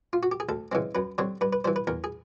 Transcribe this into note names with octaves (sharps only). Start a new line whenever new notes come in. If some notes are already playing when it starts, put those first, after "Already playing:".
F4
F#4
G4
G#4
D2 A4
C#3 E3 G#3 C4
F#2 B4
D3 G3 C4 C#5
G2 B4
B4
E3 G3 C5
B4
E2 A#4
G#4